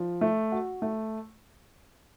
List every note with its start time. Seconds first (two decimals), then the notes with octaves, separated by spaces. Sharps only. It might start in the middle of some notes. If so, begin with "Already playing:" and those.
Already playing: F3
0.21 A3
0.52 F#4
0.82 A3